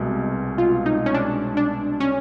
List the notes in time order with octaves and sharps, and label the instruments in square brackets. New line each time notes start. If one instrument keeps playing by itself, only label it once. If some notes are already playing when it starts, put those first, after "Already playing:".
Already playing: [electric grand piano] C2 B2 G#3
[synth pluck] F4
D#4
C#4
D4
D4
C#4